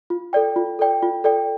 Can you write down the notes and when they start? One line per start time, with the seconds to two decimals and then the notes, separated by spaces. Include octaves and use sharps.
0.10 F4
0.33 A4 D5 G5
0.56 F4
0.79 A4 D5 G5
1.03 F4
1.24 A4 D5 G5